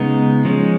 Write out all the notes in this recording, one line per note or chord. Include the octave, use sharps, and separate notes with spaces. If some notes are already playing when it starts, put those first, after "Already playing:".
Already playing: C#3 G#3 B3 D#4
F3 G#3 C#4